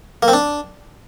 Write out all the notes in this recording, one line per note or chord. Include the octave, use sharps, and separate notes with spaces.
A#3
C4
D4